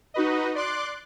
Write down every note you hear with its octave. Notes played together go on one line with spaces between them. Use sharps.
D#4 F#4 B4 D#5
D5 C6 D6 F#6